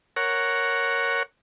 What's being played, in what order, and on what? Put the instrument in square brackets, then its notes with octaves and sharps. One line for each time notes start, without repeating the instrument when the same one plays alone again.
[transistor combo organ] A#4 C#5 F#5